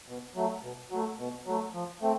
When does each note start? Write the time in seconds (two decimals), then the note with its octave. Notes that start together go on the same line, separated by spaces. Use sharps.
0.08 B2
0.36 F#3 A3
0.63 B2
0.91 F#3 A3
1.19 B2
1.46 F#3 A3
1.74 F3
2.02 A3 C4